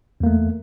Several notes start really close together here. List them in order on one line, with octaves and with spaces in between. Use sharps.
E2 A#3 A3